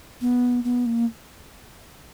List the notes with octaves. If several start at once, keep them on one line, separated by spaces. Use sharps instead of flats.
B3
B3
A#3